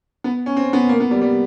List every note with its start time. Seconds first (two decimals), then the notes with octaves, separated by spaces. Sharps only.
0.24 B3
0.46 C#4
0.57 C4
0.73 B3
0.89 A#3
1.00 B3
1.11 G3
1.22 G3